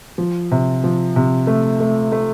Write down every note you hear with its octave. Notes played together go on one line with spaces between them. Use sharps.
F3
C3
F3
C3
A3
A3
A3